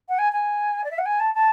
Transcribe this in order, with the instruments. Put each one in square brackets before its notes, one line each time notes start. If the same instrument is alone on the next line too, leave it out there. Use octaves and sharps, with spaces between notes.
[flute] F#5
G#5
G#5
D5
E5
F#5
G#5
A5
A5